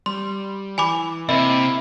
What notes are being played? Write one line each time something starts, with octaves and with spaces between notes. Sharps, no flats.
G3 C6
E3 G#5 B5 D6
C3 A#3 E4 D#5